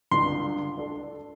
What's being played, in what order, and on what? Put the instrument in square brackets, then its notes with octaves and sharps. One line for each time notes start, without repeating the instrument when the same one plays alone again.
[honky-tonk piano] C#2 G2 D3 [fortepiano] C6
[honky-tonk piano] D4 A4